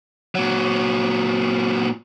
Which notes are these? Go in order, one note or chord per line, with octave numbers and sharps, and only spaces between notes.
A#2 F#3